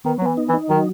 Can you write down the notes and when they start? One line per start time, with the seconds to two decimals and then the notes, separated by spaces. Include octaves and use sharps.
0.05 D#3 B3
0.18 F#3
0.22 E3 B3
0.37 D#4
0.49 E3
0.53 D#4
0.70 D#3 F#3